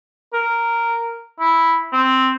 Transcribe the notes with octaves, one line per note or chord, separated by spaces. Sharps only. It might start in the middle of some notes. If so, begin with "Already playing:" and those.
A#4
E4
C4